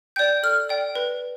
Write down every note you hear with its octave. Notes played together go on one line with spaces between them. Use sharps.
D5 G5 G6
A4 F6
D5 G5
B4